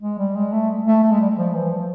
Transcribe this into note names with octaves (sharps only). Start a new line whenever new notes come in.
G#3
G3
G#3
A3
A3
A3
G#3
G3
F3
E3
F3